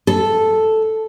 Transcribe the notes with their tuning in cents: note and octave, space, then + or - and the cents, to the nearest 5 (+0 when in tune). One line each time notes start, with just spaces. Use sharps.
A4 +0